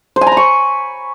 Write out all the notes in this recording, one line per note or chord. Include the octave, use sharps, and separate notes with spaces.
C5
G#5
A#5
B5
C#6